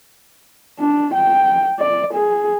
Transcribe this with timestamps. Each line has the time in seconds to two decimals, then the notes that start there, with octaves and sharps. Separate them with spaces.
0.80 D4
1.14 G5
1.80 D5
2.14 G#4